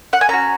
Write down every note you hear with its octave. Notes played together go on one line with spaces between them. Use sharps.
F#5
G#5
C#4 F#4 A#5